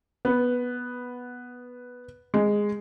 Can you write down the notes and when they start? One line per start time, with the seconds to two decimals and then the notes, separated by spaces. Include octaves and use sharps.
0.25 B3
2.34 G#3